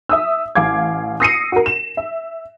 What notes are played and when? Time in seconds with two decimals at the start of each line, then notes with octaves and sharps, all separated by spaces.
0.09 E5 D#6 E6
0.55 A1 F5 D6 G#6
1.20 D#6 E6 A#6 C7 C#7 D#7
1.52 F#4 A#4
1.66 E7
1.97 E5